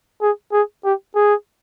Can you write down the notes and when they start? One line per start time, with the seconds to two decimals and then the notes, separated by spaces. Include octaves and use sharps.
0.22 G#4
0.52 G#4
0.84 G4
1.16 G#4